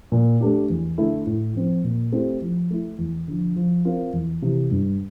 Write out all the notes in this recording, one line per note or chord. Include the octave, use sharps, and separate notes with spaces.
A#2
A3 D4 G4
E2
D3 A3 E4
A2
F3 C4
A#2
A3 C4 E4 G4
F3
A3 E4
E2
D3 F3
F3
C4 F4 A#4
E2
C3 E3
G2